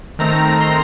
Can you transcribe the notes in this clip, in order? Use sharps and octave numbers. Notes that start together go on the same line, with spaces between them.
D#3 A3 C4 A#5
C6